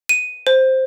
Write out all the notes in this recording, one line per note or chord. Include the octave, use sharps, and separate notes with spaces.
D#7
C5